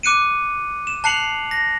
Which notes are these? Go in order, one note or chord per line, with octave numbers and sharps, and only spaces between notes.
D6 F#6 C#7 D#7
E7
A5 F#6 C7 C#7 F7 F#7
C7
A#6